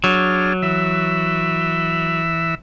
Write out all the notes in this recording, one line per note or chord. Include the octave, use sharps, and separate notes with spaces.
F#3 D4 G#4 F6
E3 E5